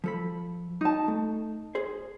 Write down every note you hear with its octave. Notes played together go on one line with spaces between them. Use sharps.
F3 A4 B5
D#4 A5
A3
G#4 C5